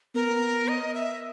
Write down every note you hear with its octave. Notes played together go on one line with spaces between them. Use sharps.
B3 A#4
D#5
E5